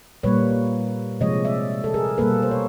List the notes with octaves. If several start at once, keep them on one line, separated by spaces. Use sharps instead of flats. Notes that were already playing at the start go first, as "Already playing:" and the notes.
A#2 G3 A#3 B4 C#5
C3 F3 G#3 C#5 D#5
D5 E5
A4
G#4 A#4
B2 G3 A#3 A4 B4
C5
C#5